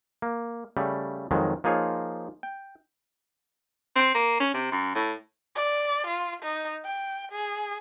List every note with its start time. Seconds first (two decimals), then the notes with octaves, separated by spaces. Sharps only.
0.22 A#3
0.77 C#3 G3 A3
1.31 F2 D#3 F#3 G#3
1.64 F3 A#3 D#4 F4 G#4 C#5
2.43 G5
3.96 C4
4.15 A#3
4.40 C#4
4.54 C3
4.72 F#2
4.95 A2
5.55 D5
6.07 F4
6.43 D#4
6.85 G5
7.32 G#4